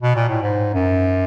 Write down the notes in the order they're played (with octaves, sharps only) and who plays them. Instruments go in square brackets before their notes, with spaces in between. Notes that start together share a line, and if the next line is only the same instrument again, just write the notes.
[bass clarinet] B2
A#2
A2
G#2
F#2